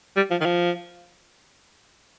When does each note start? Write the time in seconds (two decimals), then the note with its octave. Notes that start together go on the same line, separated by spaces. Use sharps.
0.16 G3
0.31 F3
0.41 D#3
0.45 F3